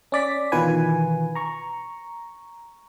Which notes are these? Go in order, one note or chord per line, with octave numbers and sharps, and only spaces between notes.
C#4 D5 B6
B2 D#3 E3 F4 B4 G#5
A#5 C#6